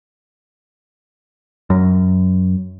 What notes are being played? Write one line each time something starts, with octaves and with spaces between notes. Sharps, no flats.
F#2